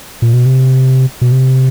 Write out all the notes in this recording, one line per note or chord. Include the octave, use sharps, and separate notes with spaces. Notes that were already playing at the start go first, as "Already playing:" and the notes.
A#2
B2
C3
B2
C3